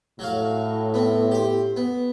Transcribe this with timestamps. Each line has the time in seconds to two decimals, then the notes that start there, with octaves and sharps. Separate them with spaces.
0.19 A2 F#3 F#4 F5
0.94 B3 C4
1.31 G4 C5
1.77 B3